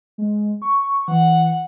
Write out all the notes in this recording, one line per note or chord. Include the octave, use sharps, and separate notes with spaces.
G#3
C#6
E3 F#5